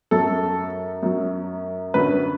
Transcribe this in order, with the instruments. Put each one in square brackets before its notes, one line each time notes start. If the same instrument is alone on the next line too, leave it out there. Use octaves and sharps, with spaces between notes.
[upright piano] F#2 F#3 A4
F#2 F#3
F#2 D3 F#3 B4